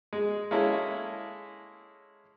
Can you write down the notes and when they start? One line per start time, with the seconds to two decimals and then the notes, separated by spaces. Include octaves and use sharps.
0.13 G#3
0.51 G#3 A#3 C#4 E4 A4